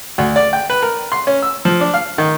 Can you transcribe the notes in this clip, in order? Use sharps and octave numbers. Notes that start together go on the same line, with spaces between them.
D2
D5
G5
B4
A#4
C6
C#4
E6
F3
D4
F5
D#3